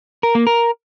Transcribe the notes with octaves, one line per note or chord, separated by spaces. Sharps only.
A#4
A#3
A#4